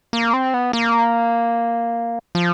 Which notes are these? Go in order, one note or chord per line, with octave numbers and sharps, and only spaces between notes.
A#3
C4
B3
A#3
F3